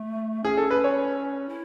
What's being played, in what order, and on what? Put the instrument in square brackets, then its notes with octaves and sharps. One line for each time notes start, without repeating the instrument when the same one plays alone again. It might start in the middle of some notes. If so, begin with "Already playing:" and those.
Already playing: [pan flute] A3
[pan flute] C#4 [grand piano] G#4
[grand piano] A4
B4
C#5
[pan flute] E4